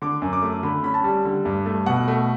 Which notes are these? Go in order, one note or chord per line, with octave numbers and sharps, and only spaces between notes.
D3 D6
F#2
D6
A3
D3 B5
C#4 B5
A5
G3
D3
G2
A3
B2 F#5
A3